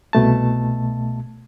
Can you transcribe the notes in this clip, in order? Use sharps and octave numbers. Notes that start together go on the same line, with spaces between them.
C2 B2 A3 A5